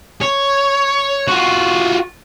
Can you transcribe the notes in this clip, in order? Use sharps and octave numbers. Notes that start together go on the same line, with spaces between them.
C#5
F4 F#4